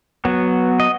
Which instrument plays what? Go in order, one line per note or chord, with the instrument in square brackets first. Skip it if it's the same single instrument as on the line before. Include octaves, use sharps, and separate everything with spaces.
[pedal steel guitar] F#3 B3
D#5